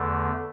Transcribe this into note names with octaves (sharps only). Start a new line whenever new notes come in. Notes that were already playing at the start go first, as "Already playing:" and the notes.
Already playing: E2 D3 A3